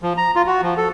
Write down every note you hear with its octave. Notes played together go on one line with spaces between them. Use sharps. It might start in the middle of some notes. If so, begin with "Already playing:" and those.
F3
A#5
F4
F#4
F3
A4